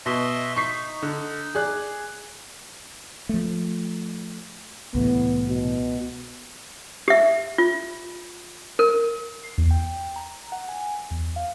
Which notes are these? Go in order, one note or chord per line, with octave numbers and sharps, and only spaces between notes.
B2 D#5 E5 C6
D#4 C#6 B6 C7
D3
G#4 D5 F#6
F3 A3
C2 A2 E3 B3
B2
G4 E5
F4
A#4
C7
E2
G5
A#5
F#5
G#5
E2
F5